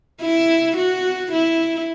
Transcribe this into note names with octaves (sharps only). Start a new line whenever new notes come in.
E4
F#4
E4